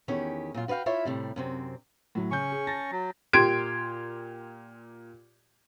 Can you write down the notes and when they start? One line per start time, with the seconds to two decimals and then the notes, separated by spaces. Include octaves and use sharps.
0.08 E2 D#3 C#4 G4
0.54 A#2 F#3 F4
0.68 F#4 B4 D5 F5 G5
0.86 E4 F4 C#5 E5
1.05 A2 C3 G3
1.36 F#2 C3 C4
2.15 A2 F#3
2.31 C#3 C#4 C#6 G6
2.52 G#4
2.67 A5 A6 A#6
2.91 F#3
3.33 A#2 G4 C6 G#6 D7